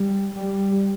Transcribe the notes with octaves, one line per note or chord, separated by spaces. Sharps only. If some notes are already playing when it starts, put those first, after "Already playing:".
Already playing: G3
G3